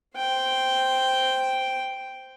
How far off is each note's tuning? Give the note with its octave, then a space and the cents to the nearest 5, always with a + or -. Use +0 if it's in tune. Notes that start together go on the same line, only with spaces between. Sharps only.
C5 +0 G5 +0